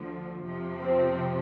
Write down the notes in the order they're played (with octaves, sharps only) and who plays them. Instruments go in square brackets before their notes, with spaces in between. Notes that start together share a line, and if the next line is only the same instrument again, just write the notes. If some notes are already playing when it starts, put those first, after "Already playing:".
Already playing: [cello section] D2 D3 F3
F2 C3 F3
[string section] C4